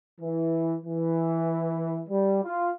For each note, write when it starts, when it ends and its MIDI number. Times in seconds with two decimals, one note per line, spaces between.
0.21 0.75 52
0.85 2.02 52
2.09 2.42 55
2.44 2.70 65